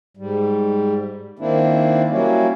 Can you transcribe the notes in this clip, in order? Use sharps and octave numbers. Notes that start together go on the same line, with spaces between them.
G#2 G3
D#3 A#3 C4 D4 E4
F#3 G3 A#3 C#4 E4